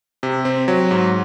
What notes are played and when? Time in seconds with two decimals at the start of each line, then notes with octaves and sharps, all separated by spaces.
0.23 C3
0.45 C4
0.68 F#3
0.91 G#2